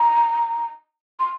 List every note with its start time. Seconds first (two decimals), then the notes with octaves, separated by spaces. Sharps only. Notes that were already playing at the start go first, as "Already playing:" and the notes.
Already playing: A#5
1.20 C6